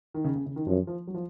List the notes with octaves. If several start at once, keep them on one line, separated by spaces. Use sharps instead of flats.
D#3
C#3
C#3
C#3
D#3
F#2 F3
F3
F#3
F3